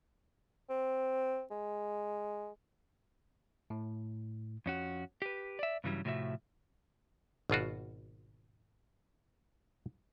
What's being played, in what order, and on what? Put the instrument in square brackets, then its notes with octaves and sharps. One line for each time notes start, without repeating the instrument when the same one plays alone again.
[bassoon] C4
G#3
[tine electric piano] A2
[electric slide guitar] F2 C#4 F#4
G4 B4
D5 E5
G2 C#3 E3 F#3 G3
A2 C3 F3 F#4 E5
[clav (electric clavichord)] G#1 B2 F4 F#4